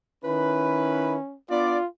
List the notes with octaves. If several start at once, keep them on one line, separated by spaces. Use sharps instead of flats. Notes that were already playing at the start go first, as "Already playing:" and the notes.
D#3 C#4 E4 B4
B3 D4 F4 D5